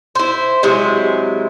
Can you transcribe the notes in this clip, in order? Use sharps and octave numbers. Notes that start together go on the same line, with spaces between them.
E4 C5
C3 F#3 G#3 E4